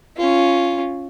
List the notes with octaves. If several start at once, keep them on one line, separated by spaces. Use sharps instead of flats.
C#4 F4